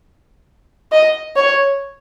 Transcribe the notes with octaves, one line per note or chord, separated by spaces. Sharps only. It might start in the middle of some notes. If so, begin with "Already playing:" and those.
D#5
C#5